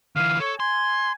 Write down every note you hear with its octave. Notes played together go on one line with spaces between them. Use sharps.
D3 E3 F5
A4 C#5
G#5 C6